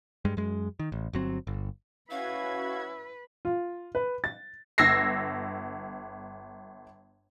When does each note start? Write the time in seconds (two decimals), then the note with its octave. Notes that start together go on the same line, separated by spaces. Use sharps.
0.25 G2 G3 G#3
0.37 F#2 G#3
0.80 D#3
0.92 A1
1.13 G1 F#3 C4
1.47 G1
2.11 C#4 E4 F#4 B4 F5 G#6
3.45 F4
3.95 B4
4.24 A6
4.78 G1 E6 G#6 A#6 C7